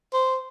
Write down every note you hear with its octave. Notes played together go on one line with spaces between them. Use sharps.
C5